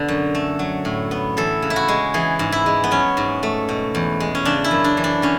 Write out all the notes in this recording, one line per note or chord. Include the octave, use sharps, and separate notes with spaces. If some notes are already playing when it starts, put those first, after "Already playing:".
Already playing: B2 D3 B3
F#2
A3
F#3
A2
B3
E3 A4
C#3
E4
F#4
G#3
E3 G#4
G#2
E4
G#3
B3
F#3 C#4
G#2
A3
B2
E2
G#3
C#4
C#3 D4
E4
F#2
D4
E3
D4
D3 C#4